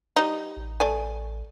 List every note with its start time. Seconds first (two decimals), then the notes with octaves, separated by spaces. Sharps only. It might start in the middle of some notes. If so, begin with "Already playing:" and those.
0.16 G3 D#4
0.57 A1
0.80 A3 D5 G#5